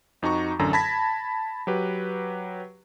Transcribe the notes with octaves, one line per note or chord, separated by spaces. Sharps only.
F2 D#4 F#4 A#5 C#6
A1 F#2 D3 F#3 A4 A#5
A5 B5 G#6 A#6 B6
F#3 G4 B4